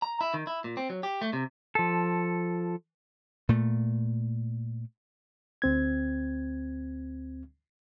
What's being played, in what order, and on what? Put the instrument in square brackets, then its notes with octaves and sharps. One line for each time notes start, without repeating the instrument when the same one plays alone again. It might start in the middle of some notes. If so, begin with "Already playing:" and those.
[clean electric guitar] A#5
E4
D#3
E4
A#2
C4
F#3
G4
A3
C3
[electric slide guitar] F3 A4
[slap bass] A#2 A3
[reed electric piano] D2 C4 G#6